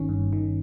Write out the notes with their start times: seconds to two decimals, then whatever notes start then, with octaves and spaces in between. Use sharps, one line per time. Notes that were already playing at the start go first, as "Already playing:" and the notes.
Already playing: G1 D#3 C#4
0.09 G2
0.33 D#3